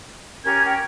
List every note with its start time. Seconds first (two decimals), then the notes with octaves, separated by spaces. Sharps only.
0.44 C#4 G4 A#4 G#6
0.66 G5